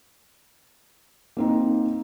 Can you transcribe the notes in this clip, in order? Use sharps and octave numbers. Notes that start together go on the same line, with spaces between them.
A#3 C4 D#4